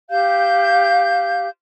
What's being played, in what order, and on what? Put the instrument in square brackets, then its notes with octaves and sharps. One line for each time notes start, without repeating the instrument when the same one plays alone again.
[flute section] G4 F5 G6